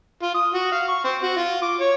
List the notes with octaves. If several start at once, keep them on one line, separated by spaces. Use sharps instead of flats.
F4
D#6
F#4
F5
C#6
C4
F#4
F4
D6
C#5